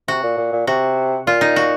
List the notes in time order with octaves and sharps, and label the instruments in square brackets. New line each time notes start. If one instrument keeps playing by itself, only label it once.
[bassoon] C3 [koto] F#4
[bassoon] A#2
A#2
A#2
[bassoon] C3 [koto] F#4
[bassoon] A#2 [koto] F4
[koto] D#4
F#4